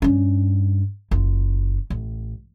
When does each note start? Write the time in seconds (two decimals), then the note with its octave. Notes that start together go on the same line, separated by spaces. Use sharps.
0.02 G2 C#4
1.11 F#1 F4
1.90 A1